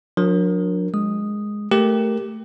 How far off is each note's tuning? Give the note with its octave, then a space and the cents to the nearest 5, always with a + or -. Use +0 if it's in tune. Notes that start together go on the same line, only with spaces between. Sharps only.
F#3 -40 D4 +0 A#4 +0
G#3 +0 D#6 -5
A3 +0 G4 +0 A#4 +0